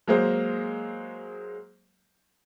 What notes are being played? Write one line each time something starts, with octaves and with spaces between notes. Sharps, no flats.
F#3 G#3 A#3 G#4 C5